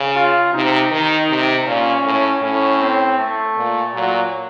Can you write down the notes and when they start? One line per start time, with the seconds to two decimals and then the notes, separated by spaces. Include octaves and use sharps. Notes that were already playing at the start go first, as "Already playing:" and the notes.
Already playing: C#3
0.16 F4
0.54 C3 D#4
0.91 D#3
1.30 C3
1.67 A#2 C#4
2.05 A2
2.42 A2 C#4
2.81 C4
3.19 A3
3.57 A#2
3.94 A#2 F#3